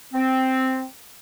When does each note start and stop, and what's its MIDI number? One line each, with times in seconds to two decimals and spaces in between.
0.13 0.84 60